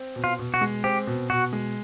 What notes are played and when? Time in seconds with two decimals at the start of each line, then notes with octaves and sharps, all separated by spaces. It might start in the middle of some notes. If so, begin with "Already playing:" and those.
Already playing: C4
0.16 B2
0.24 F4
0.39 B2
0.54 F#4
0.61 G#3
0.84 C4 G4
1.07 B2
1.30 B2 F#4
1.53 G#3